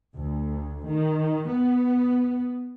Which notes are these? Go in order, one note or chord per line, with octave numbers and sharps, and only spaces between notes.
D2
D#3
B3